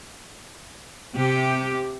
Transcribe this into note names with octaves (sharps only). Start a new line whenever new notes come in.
C3 G4